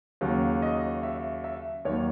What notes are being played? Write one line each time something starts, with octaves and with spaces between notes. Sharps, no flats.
D#2 C#3 F#3 F#4
D#5
E5
E5
D#2 D#3 F#3 C#5